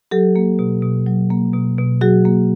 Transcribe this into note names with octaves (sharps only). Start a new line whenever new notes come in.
F#3 G4 A4
A#3
B2
B2
F#3
A#3
B2
B2
F#3 F#4 G#4
A#3